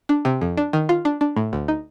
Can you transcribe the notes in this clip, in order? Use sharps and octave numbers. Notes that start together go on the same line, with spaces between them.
D4
C3
F2
D4
D#3
F4
D4
D4
A2
D2
D#4